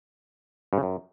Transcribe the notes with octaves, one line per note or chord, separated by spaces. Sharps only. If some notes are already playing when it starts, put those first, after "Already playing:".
G2
C#3
F#2